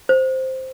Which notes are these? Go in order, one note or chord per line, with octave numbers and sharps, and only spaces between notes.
C5